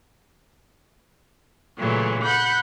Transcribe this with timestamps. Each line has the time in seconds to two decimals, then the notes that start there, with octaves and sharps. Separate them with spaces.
1.77 A#2 C#3 E3 F#3 A3
2.22 F#5 B5 G6